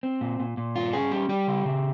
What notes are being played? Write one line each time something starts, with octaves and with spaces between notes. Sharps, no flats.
C4
A#2
A#2
A#2
G2 F4
C#4 G#4
G3 G4
G3 G4
C#3
C#3